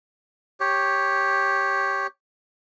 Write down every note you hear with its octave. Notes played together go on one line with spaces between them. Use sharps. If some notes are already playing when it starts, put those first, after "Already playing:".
G4 C#5